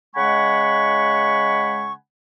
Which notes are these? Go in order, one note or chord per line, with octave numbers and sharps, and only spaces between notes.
C#3 G#3 F#5 G#5 B5 C#6